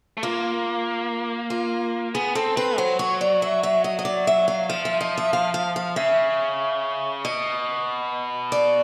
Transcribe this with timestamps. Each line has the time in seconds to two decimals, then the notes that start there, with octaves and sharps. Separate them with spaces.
0.17 A3
0.23 A#3 F4
1.50 F4
2.14 B3 G#4
2.35 C4 A4
2.56 C4 B4
2.78 F#3 C5
2.99 C#5
3.21 D5
3.42 E5
3.63 E5
3.84 D#5
3.99 D#5
4.05 D5
4.27 E5
4.48 F5
4.69 F3 F5
4.85 E5
5.01 D#5
5.18 E5
5.33 F5
5.54 F5
5.76 F5
5.96 C#3 E5
7.24 B2 D#5
8.52 D5